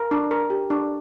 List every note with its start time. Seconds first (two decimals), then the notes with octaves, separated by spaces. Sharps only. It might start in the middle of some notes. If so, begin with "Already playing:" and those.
Already playing: A#4
0.11 D4
0.31 A#4
0.50 G4
0.70 D4